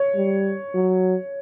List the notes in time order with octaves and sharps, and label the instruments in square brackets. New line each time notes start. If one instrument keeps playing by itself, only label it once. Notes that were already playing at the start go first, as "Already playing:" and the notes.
Already playing: [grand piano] C#5
[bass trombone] G3
F#3